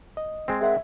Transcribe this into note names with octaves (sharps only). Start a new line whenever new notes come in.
D#5
G#3 C4
G#4 A#4 E5 F#5